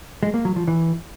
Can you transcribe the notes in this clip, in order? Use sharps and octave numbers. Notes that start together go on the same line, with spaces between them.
G#3
A#3
F#3
F3
E3